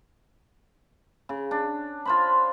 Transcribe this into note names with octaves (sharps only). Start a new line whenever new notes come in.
C#3
D4
F4 C5 B5